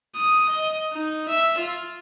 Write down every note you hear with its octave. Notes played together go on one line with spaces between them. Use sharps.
D#6
D#5
D#4
E5
F4